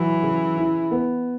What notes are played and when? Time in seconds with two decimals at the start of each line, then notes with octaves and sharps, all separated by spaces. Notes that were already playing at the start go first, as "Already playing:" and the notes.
Already playing: E3 F#3
0.23 C#3
0.57 E4
0.91 B3